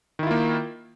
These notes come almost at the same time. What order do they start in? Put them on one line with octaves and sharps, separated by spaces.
D#3 E4 F4 A#3